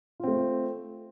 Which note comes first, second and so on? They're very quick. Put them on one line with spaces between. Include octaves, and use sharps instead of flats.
F4 C4 A3